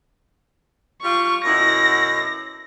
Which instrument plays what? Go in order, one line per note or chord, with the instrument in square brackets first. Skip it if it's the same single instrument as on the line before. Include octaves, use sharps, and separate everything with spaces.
[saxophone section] G3 F4 [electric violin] C#6
[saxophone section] F#2 B2 E4 [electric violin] A#6